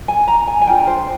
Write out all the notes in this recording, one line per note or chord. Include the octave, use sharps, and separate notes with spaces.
G#5
A#5
G#5
G#5
D4 F4 G#4 G5
C5